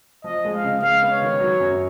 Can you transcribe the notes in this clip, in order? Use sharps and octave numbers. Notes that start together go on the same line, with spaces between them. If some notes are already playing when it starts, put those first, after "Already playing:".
F3 D#5
G#3
F5
C#3
G#3 F5
B3
C#5
D#3
F#3
F#2